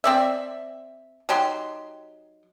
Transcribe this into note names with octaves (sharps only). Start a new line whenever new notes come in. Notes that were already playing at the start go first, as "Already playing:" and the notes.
C4 D5 E5
F#3 D#4 G4 C6